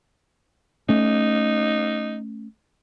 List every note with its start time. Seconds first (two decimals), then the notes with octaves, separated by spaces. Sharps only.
0.89 A3 C#4 D#4